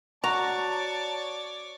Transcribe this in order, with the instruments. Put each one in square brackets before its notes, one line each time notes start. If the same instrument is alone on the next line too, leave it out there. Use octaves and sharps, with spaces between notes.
[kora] F#4 [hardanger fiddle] C#5 D5 [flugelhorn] A5 [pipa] A#5